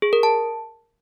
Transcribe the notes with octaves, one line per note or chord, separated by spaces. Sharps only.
G#4
A#4
A5